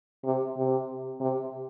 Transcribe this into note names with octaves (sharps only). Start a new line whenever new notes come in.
C3
C3
C3